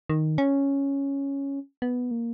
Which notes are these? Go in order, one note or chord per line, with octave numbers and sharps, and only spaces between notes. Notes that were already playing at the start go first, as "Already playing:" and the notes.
D#3
C#4
B3
A#3